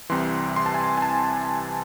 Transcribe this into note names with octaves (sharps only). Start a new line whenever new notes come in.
C2 C3 E3 C6
C6
A5
G#5
A5
G#5
A5